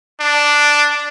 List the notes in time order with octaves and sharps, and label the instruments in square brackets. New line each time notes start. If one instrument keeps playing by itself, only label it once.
[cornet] D4